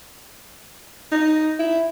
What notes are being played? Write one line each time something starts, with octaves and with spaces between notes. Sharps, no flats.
D#4
E4